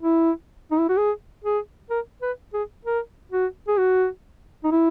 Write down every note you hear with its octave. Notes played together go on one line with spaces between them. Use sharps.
E4
D#4
E4
F#4
G#4
G#4
A#4
B4
G#4
A#4
F#4
G#4
F#4
D#4
E4